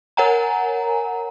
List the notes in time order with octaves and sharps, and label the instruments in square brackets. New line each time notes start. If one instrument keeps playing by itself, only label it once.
[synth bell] A#4 C#5 F#5 G#5 A#5